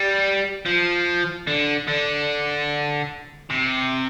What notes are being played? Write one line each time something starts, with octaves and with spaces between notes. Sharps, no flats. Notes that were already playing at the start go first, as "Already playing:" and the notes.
Already playing: G3
F3
D3
D3
C3